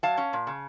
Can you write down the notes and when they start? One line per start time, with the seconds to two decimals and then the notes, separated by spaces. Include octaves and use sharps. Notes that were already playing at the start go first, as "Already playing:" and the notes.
0.03 F#3 F5 A5
0.17 C#4
0.33 A#2
0.47 C#3